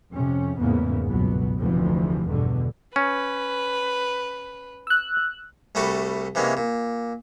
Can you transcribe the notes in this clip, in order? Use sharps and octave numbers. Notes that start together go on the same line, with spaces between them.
F2 C3 C#4
A1 E2 G#2 C#3 A#3 B3
G1 C#2 B2 F#3 B3
F1 D2 C3 E3 F3
E2 G2 B2 D3
C#4 B4
E6 F#6
C2 G3 A3 F#4 A4 B5
C3 E3 G#3 A#3 C#4
A#2